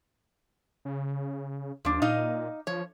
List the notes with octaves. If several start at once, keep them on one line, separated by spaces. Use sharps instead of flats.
C#3
D#2 F3 D4
A#2 D#4 D#5 F5
F3 C#5